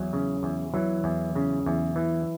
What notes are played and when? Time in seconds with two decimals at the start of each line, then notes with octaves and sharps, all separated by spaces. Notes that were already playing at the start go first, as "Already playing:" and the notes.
Already playing: E2 F#3
0.13 C#3
0.43 E2
0.74 E3 F#3
1.04 E2
1.35 C#3
1.66 E2
1.96 E3